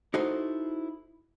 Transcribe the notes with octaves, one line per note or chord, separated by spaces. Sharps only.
D#4 E4 F#4 A4 C5 D#5